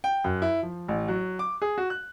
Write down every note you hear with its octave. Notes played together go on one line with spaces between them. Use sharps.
G5
F#2
E4
F3
A1
F#3
D6
G#4
F#4
F#6